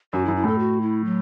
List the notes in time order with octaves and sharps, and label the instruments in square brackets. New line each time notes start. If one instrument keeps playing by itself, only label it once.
[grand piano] F#2 [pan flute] F#4
[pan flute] E4
[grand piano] F#2
[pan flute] E4
[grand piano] A2 [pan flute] A4
[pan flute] F#4
E4
F#3